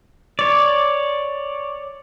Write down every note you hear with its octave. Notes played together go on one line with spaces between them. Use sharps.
C#5 D5